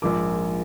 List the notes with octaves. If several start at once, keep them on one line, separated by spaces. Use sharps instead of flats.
A#1 G#2 F3 A#3 D6